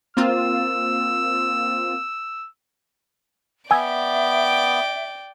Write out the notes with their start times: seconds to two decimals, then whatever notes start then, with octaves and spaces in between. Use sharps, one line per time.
0.17 A#3 C4 F4 E6
3.71 B3 D5 E5 G5 G#5 E6 G#6